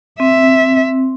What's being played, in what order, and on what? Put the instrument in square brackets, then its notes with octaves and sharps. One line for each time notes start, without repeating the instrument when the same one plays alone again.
[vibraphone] C4 [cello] E5